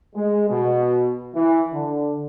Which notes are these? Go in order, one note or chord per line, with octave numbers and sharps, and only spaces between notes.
G#3
B2
E3
D3